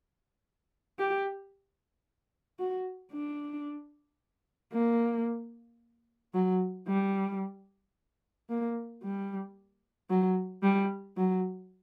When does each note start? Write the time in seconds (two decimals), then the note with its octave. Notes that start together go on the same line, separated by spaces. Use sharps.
0.99 G4
2.59 F#4
3.12 D4
4.73 A#3
6.34 F#3
6.87 G3
8.49 A#3
9.03 G3
10.10 F#3
10.63 G3
11.17 F#3